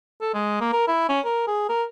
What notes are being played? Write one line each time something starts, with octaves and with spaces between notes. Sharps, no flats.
A4
G#3
A#3
A#4
E4
C#4
A#4
G#4
A#4